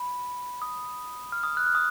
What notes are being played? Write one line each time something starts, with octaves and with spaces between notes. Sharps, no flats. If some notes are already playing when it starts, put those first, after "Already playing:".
Already playing: B5
D#6
F6
D#6
F#6
F6
D#6